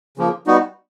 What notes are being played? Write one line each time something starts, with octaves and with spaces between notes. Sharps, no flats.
C#3 F3 A#3
G3 B3 D#4 F#4